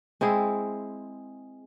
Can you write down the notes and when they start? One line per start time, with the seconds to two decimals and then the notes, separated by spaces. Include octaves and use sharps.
0.21 G#3 C4 E4 G#4